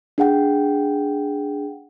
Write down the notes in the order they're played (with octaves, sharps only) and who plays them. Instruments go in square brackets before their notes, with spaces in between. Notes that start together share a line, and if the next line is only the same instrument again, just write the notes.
[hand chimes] D4 G#4 F#5 G5